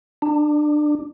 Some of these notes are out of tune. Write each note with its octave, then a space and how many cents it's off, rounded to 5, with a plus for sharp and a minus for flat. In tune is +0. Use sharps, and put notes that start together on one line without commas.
D4 +25